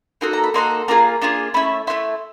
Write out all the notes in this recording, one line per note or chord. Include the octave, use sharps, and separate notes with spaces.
A#3 D#4 F#4 A4 C6
A#5
B5
A#3 D#4 F#4 A4 C6
A#3 D4 F4 G#4 A#5
A#3 D4 F4 G#4
A3 C#4 E4 B5
A3 C#4 E4 C6